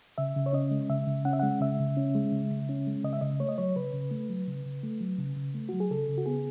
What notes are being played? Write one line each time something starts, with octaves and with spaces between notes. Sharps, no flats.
C#3 E5
C#3
C#5
C#4 D#5
G#3
C#3 E5
C#3
C#4 F#5
E5
G#3 F#5
C#3 E5
C#3
C#4
G#3
C#3
C#3
C#4
G#3
C#3 D#5
E5
C#3 D#5
A3 C#5
D#5
F#3 C#5
C#3 B4
C#3
A3
F#3
C#3
C#3
A3
F#3
C#3
C#3
A3
F#3 F#4
G#4
C#3 A4
C#3
F#4
B3 G#4